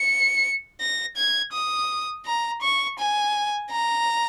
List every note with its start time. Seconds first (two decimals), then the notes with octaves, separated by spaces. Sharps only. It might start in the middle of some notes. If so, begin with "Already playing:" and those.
Already playing: C#7
0.80 A#6
1.16 G#6
1.53 D#6
2.25 A#5
2.62 C#6
2.99 G#5
3.71 A#5